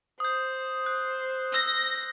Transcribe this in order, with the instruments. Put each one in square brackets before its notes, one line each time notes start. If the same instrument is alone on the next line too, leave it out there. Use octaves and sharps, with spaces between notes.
[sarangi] C5 [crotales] D#6 G6
[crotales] F#6
[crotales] E6 [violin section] A#6